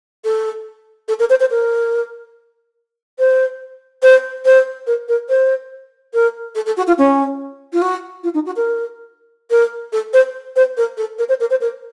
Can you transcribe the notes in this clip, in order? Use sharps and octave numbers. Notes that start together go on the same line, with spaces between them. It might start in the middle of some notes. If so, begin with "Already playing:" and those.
A4
A4
A#4
C5
C5
A#4
C5
C5
C5
A#4
A#4
C5
A#4
A4
A4
F#4
F4
C#4
F4
F#4
F4
D#4
F#4
A#4
A#4
A4
C5
C5
A#4
A4
A#4
C5
A#4
C5
A#4